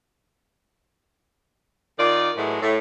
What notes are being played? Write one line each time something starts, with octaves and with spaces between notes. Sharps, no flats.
D#3 F4 D5
A2 E3 F#3 G#3
A2